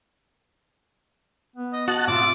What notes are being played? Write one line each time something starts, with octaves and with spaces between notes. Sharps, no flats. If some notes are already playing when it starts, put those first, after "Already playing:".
B3
D#5
F#4 D#5 F#5 A5 F#6
A2 C3 F4 E5 D6